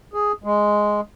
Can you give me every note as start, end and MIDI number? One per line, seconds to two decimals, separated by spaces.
0.14 0.32 68
0.44 1.01 56